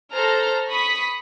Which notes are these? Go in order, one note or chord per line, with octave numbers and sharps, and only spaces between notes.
A4 C5 A#5 F6
B5 C#6 D#6 B6